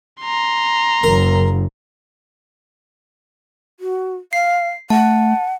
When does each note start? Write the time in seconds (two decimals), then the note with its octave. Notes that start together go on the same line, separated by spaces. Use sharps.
0.22 A#5 C6
1.03 F#1 A#4
3.80 F#4
4.33 F5 C7
4.90 A3 F#5 A5